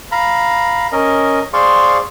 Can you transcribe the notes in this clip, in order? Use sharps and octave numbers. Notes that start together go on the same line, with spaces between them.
F5 A#5 B5
C#4 A#4 D#5
G#4 C5 D5 F5 C6 C#6